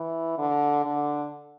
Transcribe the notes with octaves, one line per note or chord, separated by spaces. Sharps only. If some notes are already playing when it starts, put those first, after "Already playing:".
Already playing: E3
D3
D3